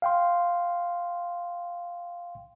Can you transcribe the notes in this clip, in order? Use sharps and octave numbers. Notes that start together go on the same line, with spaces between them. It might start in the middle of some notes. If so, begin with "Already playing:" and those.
F5 G5 C6